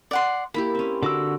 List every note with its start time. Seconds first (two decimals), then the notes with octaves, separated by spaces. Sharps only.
0.11 D5 F#5 C6
0.54 A#3 E4 G4 B5
0.75 C4 C#4
1.03 D3 F#4 D6 E6